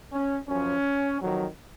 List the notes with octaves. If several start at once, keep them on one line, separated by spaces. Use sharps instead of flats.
C#4
F#2 F3 C#4
F2 D#3 F#3